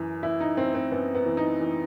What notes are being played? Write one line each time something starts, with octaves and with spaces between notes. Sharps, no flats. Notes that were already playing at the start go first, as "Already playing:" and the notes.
Already playing: F#2 E3
E3 E4
D#4
F#2 C4
C4
F#2 B3
B3
E3
D#4
E3